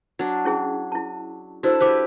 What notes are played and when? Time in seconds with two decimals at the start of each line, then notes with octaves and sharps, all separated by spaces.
0.19 F#3 D4
0.45 C#4 E4 G#4
0.92 E4 A5
1.63 D4 E4 F#4 A4 C5 E6
1.80 E4 G4 B4 C5 D6